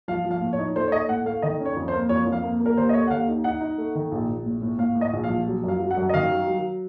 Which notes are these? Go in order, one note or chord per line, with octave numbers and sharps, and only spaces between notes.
F3 F5
F3
F5
A2
C#5
D#4
A3 C5
C#5
A3 D#5
A2 F#5
A3 F5
D#3 D#5
C#4
C#5
F2
C5
A#3
F2 C#5
F2
F5
A#3
A#3
A#4
D#2 C5
D#5
A3 C#5
F#5
D#2 F5
D#4
D#4 F#5
D#4
A3
D#3
A#1
A#1
A2
A2
A2 F5
A2
D#5
A#1
F5
F3
F#3
F#2 F5
F#3
F#5
F#2
D#5
D#3 F5
F#3
F#3